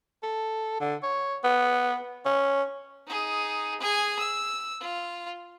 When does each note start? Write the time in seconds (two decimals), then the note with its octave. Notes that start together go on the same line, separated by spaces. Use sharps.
0.23 A4
0.80 D3
1.03 C#5
1.44 B3
2.25 C#4
3.07 D#4 G#4
3.80 G#4 G#5
4.19 E6
4.80 F4